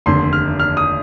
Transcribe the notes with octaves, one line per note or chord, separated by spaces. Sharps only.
F1 D#2 D3 C6
F6
F6
D#6